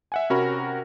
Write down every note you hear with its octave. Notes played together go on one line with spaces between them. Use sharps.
E5 F#5 G#5
C3 C#4 F#4 A#4 B5